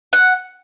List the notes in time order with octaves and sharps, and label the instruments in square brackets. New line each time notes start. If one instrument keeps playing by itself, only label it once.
[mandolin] F#5